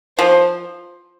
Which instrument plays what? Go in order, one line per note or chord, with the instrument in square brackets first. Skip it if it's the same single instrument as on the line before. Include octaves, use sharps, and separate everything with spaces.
[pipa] F3 [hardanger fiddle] C5